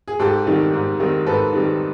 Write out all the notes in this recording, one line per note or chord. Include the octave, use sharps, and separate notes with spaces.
G#4
G#2 G4 A4
D#3 G3 C4 D#4
G#2
D#3 G3 C4 D#4
G#2 A4 B4
D#3 G3 C4 D#4